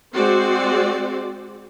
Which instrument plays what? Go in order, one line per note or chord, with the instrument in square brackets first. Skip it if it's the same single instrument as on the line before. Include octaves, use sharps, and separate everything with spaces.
[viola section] G#3 C4 F#4 C5 D5